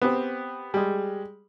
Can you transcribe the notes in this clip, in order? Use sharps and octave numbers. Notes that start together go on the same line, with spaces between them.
B3 C4 G4
G3 G#3